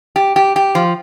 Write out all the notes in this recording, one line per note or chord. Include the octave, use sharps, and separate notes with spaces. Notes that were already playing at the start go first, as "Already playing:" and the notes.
G4
G4
G4
F3